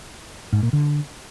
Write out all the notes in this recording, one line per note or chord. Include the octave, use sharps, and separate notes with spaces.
G#2
A#2
D3